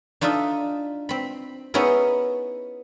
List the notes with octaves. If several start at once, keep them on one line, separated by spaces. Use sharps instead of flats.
D4 D#4 F4 A4 E5
C4 B5
B3 C#4 D#4 E4 G#4 A#4